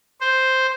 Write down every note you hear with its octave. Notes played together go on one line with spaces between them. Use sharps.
C5